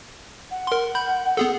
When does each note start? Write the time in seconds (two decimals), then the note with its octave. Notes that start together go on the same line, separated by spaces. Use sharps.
0.51 F#5
0.67 A#4 C6
0.95 B5 G6
1.37 B3 G#4 A4